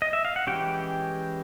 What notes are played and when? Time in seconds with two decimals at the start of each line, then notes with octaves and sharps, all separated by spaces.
0.02 D#5
0.13 E5
0.25 F5
0.36 F#5
0.47 E3 G#3 C#4 G4 G5